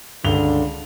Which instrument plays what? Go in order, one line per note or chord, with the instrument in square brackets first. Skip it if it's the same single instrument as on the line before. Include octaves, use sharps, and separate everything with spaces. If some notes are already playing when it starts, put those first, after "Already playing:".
[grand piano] C#2 F7 G7 [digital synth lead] G2 [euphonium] D3